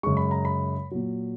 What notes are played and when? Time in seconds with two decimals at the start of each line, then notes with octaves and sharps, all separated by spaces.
0.03 F#2 C#3 G#3 C#6
0.17 B5
0.31 A#5
0.45 B5
0.91 A#2 F#3